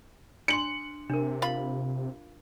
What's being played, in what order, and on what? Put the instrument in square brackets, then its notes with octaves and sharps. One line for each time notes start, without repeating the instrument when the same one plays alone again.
[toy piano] D4 C6 [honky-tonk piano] C#7 F#7
[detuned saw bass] C3 [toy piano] D4 A#4
[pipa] F4 B5